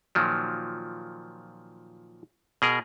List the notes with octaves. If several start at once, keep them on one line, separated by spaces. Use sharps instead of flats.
A#2 D#3 F3 F#3
B2 G#4 A#4